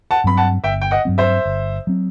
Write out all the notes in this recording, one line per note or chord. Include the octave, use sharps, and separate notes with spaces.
F#5 A5
G2 F#3 C4 B5
F#5 A5
G1 E5 G5
G5
D#5 F#5
G2 F#3 C4
C5 E5
G1
F#3 C4